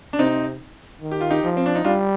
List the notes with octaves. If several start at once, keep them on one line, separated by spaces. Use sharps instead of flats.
D4
C3 C4 D#4
D#3
G4
F4
D#4 G4
F3
C4
D4
D#4
G3 D4 F4